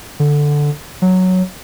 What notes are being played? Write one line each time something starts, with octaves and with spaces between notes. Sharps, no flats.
D3
F#3